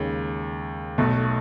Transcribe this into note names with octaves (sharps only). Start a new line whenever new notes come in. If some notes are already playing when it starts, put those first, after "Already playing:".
Already playing: D#2 C#3 G#3
B1 B2 A3